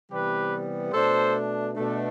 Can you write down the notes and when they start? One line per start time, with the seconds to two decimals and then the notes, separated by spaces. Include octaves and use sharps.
0.11 C3 E3 G3 B3 G4 B4
0.92 B2 A3 D4 A4 C5
1.73 B2 A3 D4